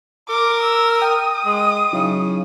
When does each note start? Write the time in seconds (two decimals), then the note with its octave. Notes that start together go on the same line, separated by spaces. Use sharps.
0.29 A#4 D6
0.63 E6
1.02 G5 D#6
1.45 G#3
1.93 C#3 F#3 D#4 E4